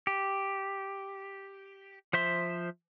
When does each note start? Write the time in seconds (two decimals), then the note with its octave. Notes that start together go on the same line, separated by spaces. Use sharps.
0.07 G4
2.13 F3 C5 E5 C6